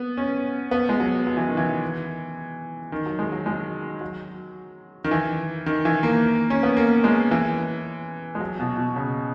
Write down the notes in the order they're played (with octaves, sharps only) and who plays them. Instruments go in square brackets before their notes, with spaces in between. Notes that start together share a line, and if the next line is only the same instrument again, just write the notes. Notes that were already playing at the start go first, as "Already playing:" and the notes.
Already playing: [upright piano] B3
C#4
B3
G#3
F#3
F#3
E3
D#3
E3
D#3
F#3
G#3
F#3
G#3
F#3
D#3
E3
D#3
E3
A#3
C#4
B3
A#3
G#3
E3
G#3
F#3
B2
B2
C#3